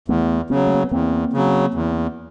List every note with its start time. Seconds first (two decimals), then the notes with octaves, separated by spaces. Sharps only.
0.08 E2 A3 B3
0.50 C#3 F#3 B3 C#4
0.67 A3
0.74 A#3
0.84 B3
0.91 E2 A#3 C4
1.33 C#3 F#3
1.74 E2